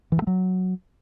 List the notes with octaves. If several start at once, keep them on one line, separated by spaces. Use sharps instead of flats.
E3
G2
A3
F#3